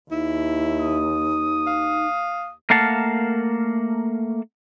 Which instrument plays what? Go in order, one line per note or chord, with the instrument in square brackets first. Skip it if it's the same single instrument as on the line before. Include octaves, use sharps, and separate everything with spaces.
[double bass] D#2 [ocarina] D#4 [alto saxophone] E4
[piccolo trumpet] D#6
[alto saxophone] F5
[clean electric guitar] A3 A#3 A#4 F5 F#5 A5